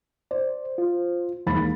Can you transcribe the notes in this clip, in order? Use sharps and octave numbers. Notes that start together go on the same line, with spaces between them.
C5 D5
F4
D#2 E3 G#3 B5 A6